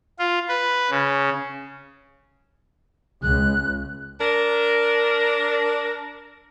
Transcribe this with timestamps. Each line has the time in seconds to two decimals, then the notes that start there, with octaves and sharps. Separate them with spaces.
0.19 F4
0.48 B4
0.90 C#3
3.22 C#2 F#6
4.21 D4 A#4